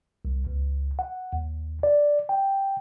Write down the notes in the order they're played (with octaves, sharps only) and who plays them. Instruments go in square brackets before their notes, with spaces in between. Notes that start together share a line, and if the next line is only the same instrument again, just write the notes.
[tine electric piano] C2
C#2
F#5
D#2
D5
G5